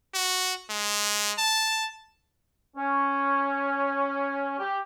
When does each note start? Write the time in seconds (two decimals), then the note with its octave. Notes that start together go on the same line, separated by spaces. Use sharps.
0.14 F#4
0.70 G#3
1.38 A5
2.77 C#4
4.59 G4